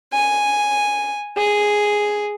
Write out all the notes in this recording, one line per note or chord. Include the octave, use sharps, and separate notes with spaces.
G#5
G#4